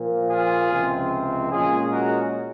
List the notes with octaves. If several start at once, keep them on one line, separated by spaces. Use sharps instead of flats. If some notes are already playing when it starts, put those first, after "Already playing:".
Already playing: A#2 F3 A#3
F4 G#4
C#2 C3 F3 C4
A#2 G#3 C#4 F4 G#4
F#4 A#4